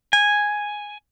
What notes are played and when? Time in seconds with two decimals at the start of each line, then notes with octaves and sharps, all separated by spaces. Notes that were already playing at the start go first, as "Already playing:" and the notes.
0.13 G#5